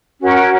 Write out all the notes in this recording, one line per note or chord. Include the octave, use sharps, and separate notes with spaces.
C#4 F#4 A#4